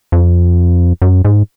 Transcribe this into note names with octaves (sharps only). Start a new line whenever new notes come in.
F2
F#2
G#2